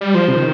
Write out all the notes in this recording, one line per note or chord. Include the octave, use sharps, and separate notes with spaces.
G3
F3 C5
C3
D#3